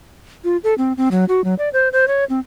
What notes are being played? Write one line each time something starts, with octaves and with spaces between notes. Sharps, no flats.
F4
A4
C4
C4
F#3
F#4
F#3
D5
C5
C5
C#5
C4